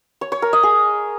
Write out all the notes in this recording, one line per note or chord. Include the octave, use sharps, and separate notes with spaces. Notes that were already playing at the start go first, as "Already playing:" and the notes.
C#5
C#5
A#4
D#5
G#4